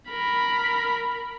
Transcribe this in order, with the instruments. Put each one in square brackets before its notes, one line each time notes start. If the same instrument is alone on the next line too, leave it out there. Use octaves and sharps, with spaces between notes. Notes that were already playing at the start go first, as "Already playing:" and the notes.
[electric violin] A#4 B5